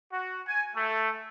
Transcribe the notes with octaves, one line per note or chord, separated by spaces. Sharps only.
F#4
G#5
A3